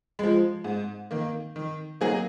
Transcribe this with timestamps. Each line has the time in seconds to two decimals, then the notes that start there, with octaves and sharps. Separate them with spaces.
0.19 F3 G#3
0.64 G#2
1.11 D#3 A#3
1.56 D#3
2.01 F#3 A#3 D#4 G#4